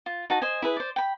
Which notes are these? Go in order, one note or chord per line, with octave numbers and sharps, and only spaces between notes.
F4
D#4 F#4 A5
C5 D#5 G#5
E4 G#4 B4
C5 D5
G5 B5